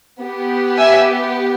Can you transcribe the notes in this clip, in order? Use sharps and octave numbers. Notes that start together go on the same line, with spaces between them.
B3 G4
E5 G#5